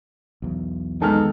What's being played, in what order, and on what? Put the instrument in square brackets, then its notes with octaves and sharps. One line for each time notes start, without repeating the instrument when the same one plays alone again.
[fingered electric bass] B1 E2
[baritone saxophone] D#3 [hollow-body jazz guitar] G#3 B3 G#4 [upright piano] A4 F6